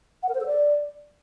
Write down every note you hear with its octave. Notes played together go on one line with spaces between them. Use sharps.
F#5
A#4
C5
A4
D5